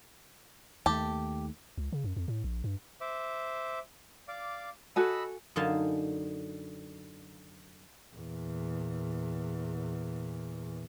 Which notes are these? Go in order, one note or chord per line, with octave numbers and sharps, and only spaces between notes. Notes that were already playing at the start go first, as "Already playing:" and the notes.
D#2 A3 G4 A5
C#2
C#3
F#2
F2
A2
A#1
G2
C5 E5 D6
D5 F5 D6
F#4 A4 D#5 G#5 B5 E6
F#2 D3 D#4 F5 G#5 A5
E2 A#2